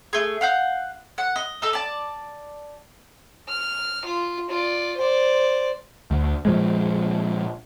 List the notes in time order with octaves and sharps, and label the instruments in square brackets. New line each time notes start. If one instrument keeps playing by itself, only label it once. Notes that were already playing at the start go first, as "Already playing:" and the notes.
[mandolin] A3 G#4
F5 F#5 G6
F#5
D#5
D#4 A4
D5 A5
[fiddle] F6
F4
F4 D5
C5 D5
[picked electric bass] D2
A#2 F3 G#3